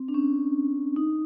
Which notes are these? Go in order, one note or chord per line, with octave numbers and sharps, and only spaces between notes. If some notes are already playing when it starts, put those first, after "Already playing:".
Already playing: C4
D4
C#4
D#4